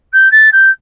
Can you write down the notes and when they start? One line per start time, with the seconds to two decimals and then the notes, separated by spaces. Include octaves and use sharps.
0.13 G6
0.32 A6
0.52 G6